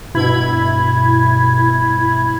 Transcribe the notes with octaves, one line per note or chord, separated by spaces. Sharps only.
G2 B2 E4 B5 G#6